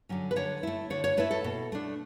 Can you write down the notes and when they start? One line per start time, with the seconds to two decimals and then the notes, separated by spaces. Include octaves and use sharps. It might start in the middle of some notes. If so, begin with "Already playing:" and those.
0.09 D3 F#3 C#4
0.31 B4
0.36 D3 C#5
0.63 A3 E4
0.90 D3 C#5
1.04 C#5
1.17 A3 E4 B4
1.31 A4
1.44 B2
1.72 A3 D4